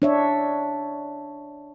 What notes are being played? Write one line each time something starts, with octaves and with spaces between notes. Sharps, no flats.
D4 C#5 E5